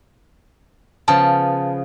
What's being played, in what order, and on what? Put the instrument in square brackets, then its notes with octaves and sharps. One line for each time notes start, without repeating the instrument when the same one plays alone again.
[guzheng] C#3 F3 B3 [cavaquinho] A5